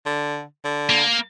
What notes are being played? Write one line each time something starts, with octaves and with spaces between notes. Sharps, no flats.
D3
D3
A#3